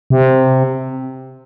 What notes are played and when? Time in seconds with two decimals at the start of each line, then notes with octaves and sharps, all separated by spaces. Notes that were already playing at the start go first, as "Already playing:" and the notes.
0.10 C3